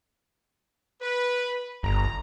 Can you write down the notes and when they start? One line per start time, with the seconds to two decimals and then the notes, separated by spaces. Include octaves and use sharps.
1.01 B4
1.83 G1 A#5